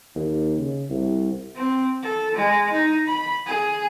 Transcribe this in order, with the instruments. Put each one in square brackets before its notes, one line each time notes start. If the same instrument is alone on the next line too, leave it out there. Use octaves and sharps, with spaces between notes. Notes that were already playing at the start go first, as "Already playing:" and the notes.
[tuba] D#2
C#3
C2
[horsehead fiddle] C4
A4
G#3
D#4
B5
G#4